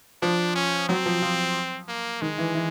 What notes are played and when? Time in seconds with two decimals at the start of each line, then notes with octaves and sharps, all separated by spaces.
0.22 F3 D4
0.56 C#4
0.89 F#3 C4
1.06 F3
1.22 F3
1.88 A#3
2.21 D#3 G#3
2.38 E3
2.55 E3